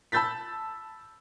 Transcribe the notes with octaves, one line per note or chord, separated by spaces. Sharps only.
A5 B5 E6 G6 A6 B6